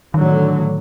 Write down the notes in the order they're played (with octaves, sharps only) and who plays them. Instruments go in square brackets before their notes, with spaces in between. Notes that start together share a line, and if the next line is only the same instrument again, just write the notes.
[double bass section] A2 D3 F#3 [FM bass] D#3